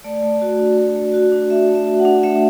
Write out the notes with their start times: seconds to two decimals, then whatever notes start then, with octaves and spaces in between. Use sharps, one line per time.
0.04 A3 D5
0.23 A3
0.41 F#4
0.59 D4
0.77 A3
0.96 A3
1.14 F#4
1.32 D4
1.50 A3 E5
1.68 A3
1.75 E5
1.87 F#4
1.99 F#5
2.05 D4
2.23 A3 E5